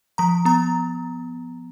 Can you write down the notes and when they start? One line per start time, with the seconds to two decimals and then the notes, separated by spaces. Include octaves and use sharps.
0.18 F3 A#5
0.45 B3 A#5